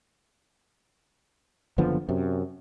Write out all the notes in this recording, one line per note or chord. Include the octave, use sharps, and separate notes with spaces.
F#1 D3 F3 B3
F#2 C3